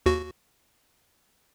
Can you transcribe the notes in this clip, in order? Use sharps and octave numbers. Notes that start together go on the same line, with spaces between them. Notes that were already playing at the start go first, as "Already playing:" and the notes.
D#2 F#4